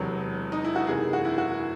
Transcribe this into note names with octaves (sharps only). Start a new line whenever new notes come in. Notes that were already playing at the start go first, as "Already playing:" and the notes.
Already playing: E1 E2 C3 F#3
D#4
E4
F#4
F#1 E2 C3 E3 G#4
F#4
E4
F#4